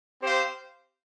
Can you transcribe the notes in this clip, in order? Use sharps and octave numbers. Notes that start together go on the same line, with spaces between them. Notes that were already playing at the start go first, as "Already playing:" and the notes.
C4 G4 C5 F5